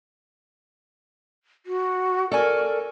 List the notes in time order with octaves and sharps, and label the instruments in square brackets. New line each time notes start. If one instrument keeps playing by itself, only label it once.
[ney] F#4
[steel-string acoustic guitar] A4 D5 G#5 [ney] A#4